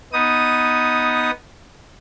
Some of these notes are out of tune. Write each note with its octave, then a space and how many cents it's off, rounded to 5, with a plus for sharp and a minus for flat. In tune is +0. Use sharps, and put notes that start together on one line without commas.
B3 +0 D#4 +10 D#6 +0